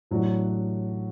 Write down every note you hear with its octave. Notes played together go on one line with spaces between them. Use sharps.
A1 A2 F#3 D4 F#4